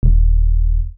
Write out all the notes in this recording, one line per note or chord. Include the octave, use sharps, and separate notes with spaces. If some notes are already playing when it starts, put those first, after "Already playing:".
D#1